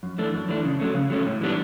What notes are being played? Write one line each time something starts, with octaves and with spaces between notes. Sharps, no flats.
F#2
E3 A3 D4
F#2
E3 A3 D4
C#3
F#3 A3 C#4
C#3
F#3 A3 C#4
A2
E3 G3 B3 D4